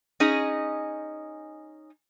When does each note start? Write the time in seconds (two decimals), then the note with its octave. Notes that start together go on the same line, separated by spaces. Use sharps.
0.20 C#4 D#4 G#4 D#5